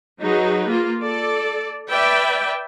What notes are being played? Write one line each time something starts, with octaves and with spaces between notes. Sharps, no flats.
F#3 D#4 G#4 B4
A#3 F4
A4 D5
B4 D5 E5 G5